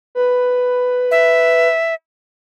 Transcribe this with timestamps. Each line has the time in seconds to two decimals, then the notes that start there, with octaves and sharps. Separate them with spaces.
0.15 B4
1.11 E5